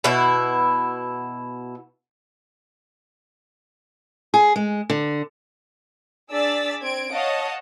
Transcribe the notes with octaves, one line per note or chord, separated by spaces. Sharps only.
B2 E4
G#4
G#3
D3
D4 G#4 D5 E6 A6 B6
C4 G#6 D7
C#5 D#5 F5 F#5 A5